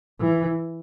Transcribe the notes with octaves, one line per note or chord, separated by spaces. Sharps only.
E3